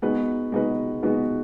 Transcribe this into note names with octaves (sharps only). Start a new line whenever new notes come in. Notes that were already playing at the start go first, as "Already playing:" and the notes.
G#3 B3 D#4 F#4 B4
G#3 B3 D#4 F#4 B4
G#3 B3 D#4 F#4 B4